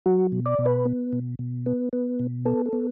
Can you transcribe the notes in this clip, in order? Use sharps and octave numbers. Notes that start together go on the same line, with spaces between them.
F#3 F#4
B2
D5
B2
B4
B3
B2
B2
B3
B3
B2
B3 A4
A4
B3